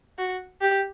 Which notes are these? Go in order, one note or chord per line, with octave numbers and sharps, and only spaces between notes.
F#4
G4